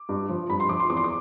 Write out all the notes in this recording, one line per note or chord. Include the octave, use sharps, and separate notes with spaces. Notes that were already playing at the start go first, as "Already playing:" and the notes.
Already playing: D6
G2
F3
G2 B5
C6
F3 D6
C6
E2 D6
C6
D6